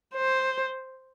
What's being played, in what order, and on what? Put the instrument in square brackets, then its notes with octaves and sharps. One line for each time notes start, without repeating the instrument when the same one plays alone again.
[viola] C5